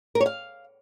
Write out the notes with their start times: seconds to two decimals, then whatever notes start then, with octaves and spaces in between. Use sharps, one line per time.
0.15 A#4
0.20 C#5
0.26 F5